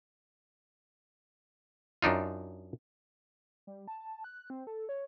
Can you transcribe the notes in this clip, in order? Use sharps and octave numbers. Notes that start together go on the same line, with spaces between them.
F#2 D4 D#4 F4
G3
A5
F#6
C4
A4
C#5